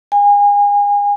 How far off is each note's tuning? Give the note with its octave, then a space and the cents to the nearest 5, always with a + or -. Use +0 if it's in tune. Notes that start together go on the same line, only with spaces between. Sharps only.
G#5 -30